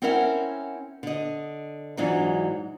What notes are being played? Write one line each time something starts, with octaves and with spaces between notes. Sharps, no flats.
C4 C#4 E4 A#4 E5 F#5
D3 D#5
G#2 E3 F#3 D4 D#4 F4